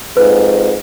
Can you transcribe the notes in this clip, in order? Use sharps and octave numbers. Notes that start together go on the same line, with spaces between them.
F2 G#2 B4